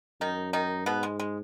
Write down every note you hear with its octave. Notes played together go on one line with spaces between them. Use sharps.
F#2 D#3 D#4
D#3 D#4
G#2 B2 B3
G#3
G#3